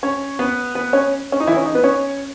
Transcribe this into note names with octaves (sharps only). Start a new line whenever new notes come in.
C#4 C#5
B3 B4
B3 B4
C#4 C#5
C#4
D#4
E3 E4
C#4
D#4
B3 B4
C#4 C#5